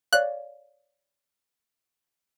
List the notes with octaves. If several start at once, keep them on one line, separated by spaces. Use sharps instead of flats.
C#5 D5 F5 F#6